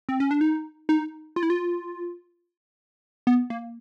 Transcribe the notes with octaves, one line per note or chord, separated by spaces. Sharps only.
C4
C#4
D4
D#4
D#4
F4
E4
F4
B3
A#3